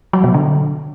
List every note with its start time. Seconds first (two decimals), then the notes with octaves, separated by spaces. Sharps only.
0.13 F#3
0.24 B2
0.34 D3